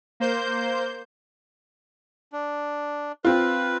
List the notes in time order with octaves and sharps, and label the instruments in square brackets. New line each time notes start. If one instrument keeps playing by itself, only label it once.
[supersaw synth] A#3 C5 G6
[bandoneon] D4
[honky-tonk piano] C4 F4 [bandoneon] B4